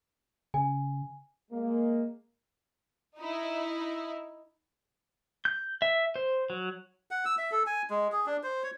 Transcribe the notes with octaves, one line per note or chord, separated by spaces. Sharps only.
C#3 G#5
G#3 A#3
D#4 E4
G6
E5
C5
F#3
F#5
E6
E5
A4
G#5
G#3
G#4
D4
C5
C#5